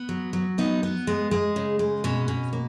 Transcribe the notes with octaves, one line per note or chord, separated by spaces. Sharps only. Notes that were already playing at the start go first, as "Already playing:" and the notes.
Already playing: B3
F#3
F#3
B3 D#4
B3
G#3
G#3
C#3
G#3
B2 C#4
B2
A#3